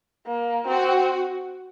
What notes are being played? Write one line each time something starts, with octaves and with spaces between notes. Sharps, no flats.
A#3
C4 F#4